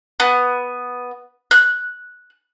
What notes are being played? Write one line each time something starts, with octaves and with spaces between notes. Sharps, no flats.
B3
F#6